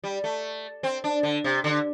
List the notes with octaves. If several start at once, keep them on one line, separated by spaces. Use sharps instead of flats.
G3
A3
C4
D4
D3
C3
D3